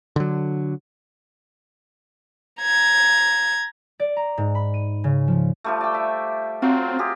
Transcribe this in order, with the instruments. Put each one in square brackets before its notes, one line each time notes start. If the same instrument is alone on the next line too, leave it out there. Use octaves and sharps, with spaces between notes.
[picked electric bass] D3 F#3
[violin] A#5 G#6
[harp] D5
A#5
G#2
B5
D#7
C#3
F3
[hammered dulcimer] F3 G3 A3
D5 G5
E5
[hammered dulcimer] F#3 F4 [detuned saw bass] C4
[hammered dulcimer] C4 G4 G#4